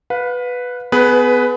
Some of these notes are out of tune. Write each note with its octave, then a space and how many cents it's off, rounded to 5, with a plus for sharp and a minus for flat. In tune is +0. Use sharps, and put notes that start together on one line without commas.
B4 +0 F5 +40
B3 +25 G#4 +25 B4 +0